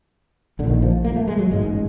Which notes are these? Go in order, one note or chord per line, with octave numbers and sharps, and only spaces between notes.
A#1 A#2 D3
D#3
F3
A#3
A3
G#3
F#3
A1 G#2 G#3